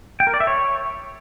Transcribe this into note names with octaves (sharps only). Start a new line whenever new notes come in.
G5
A#4
D5
E5
C#5